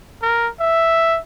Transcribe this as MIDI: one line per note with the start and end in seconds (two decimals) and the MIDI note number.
0.22 0.49 70
0.60 1.19 76